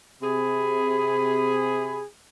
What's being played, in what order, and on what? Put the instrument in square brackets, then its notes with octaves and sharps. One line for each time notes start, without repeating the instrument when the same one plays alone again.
[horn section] C3 G#4 B5